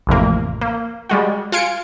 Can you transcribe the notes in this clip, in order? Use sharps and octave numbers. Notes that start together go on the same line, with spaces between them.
A1 F2 C3 A#3
A#3
G3 G#3 F#4
F4 F5 G#5 C#7 D7